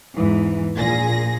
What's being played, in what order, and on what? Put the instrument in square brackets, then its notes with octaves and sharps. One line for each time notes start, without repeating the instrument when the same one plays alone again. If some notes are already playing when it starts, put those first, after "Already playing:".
[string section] E2 G#2 E3
A#1 A#2 G#4 A#6